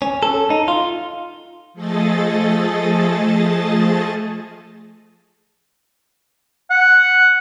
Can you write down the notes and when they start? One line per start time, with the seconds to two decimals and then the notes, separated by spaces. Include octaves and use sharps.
0.02 C#4
0.23 A4
0.50 D#4
0.68 F4
1.74 F3 A3 G#4 A4 D#5 A6
6.71 F#5